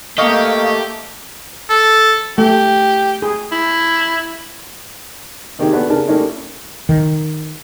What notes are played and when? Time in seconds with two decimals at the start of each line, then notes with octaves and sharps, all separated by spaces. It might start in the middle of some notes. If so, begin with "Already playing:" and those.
0.18 A3 A#3 G4 D#5 F5 C#6
1.69 A4
2.38 A3 G4
3.22 G#4
3.52 E4
5.59 C3 D#3 A#3 D#4 G4 G#4
5.73 B3 D4 F#4 A4 B4 D5
5.90 C#3 A#4 D5 A5
6.08 G3 A3 A#3 C#4 D#4 E4
6.89 D#3